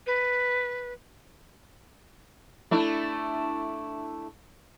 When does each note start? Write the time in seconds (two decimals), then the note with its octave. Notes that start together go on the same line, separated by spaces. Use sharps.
0.07 B4
2.71 A3 D4 E4